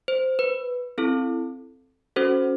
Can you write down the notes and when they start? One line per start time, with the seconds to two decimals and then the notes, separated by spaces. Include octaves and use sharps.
0.08 C5
0.39 B4
0.98 C4 E4 A4
2.16 C#4 F#4 A4 C5